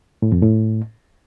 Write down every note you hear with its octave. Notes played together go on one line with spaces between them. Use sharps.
A2
F2
A2